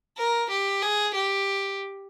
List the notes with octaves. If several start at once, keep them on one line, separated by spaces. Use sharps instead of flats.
A#4
G4
G#4
G4